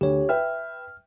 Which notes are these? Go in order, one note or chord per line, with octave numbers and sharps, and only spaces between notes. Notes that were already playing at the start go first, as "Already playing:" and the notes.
D2 G4 C#5
B4 E5 G5 F6